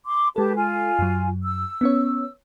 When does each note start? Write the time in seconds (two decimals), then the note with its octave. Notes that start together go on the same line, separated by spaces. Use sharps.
0.06 C6 D6
0.36 G#3 G4 A4 B4 A5
0.56 F4 G#5
0.99 F#2 F#3
1.44 E6
1.81 B3 C#4 C#5